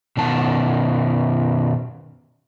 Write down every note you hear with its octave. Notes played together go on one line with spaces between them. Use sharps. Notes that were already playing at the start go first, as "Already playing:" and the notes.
B2 D#3 A5